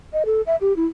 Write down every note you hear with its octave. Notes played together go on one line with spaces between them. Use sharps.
D#5
A4
E5
G4
E4